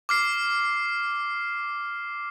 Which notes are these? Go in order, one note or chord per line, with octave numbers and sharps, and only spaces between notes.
D6 F6 C7